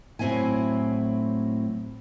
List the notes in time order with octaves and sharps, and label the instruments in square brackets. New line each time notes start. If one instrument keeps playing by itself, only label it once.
[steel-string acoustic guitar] A2 F#3 C4 E4 G#5